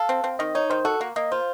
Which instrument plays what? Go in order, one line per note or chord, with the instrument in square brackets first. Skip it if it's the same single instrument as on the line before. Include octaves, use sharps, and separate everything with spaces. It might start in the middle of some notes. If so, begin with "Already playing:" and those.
Already playing: [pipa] A4 [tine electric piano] F5
[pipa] C4
C4
[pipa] D#3 [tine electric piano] D#5
[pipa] D#4 [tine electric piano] C#5
[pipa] D#3 [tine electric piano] C5
[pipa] F#4 [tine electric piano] A4
[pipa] A#3
[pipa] A#3 [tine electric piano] D#5
[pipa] F4 [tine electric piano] C5